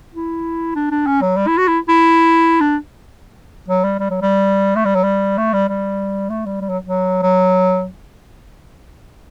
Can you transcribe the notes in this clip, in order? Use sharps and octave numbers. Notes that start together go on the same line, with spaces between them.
E4
D4
D4
C#4
F#3
G3
E4
F#4
E4
E4
D4
F#3
G3
G3
F#3
G3
A3
G3
F#3
G3
A3
G3
G3
A3
G3
G3
F#3
F#3
F#3